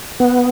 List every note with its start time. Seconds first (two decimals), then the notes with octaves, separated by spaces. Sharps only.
0.20 B3